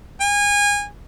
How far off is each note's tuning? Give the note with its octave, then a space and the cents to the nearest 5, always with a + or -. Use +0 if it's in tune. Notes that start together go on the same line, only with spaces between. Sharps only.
G#5 -25